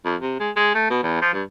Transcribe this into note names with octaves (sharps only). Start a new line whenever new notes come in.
F2
C3
G#3
G#3
A3
B2
E2
F3
G2